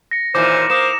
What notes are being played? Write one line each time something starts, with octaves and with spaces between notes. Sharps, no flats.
A#6 C#7
D#2 A#2 E3 C5 D6
A#3 C5 D#6 E7